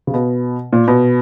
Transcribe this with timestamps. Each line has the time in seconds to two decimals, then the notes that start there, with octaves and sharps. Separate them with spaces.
0.07 C#3
0.14 B2
0.73 A#2
0.88 B2